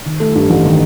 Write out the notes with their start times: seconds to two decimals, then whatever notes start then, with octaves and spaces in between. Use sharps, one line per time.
0.06 D#3
0.20 A3
0.35 G2
0.50 A1
0.65 D#3